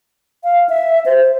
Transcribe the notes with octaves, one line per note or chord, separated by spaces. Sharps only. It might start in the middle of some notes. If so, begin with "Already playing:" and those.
F5
E5
C5